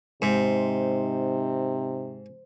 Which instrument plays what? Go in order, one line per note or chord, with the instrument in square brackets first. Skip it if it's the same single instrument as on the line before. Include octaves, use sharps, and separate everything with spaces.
[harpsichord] G#2 [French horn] C3 [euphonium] D#4 [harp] C5